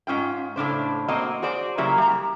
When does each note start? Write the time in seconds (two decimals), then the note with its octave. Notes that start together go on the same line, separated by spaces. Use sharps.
0.07 G#2 C#4 F4 G5
0.56 A2 C#3 D4 C5
1.08 A#3 C4 F#4 D#5
1.42 F#4 G#4 C5 D5
1.78 C#3 F#3 A#3 E4 G4
1.98 G3 A#5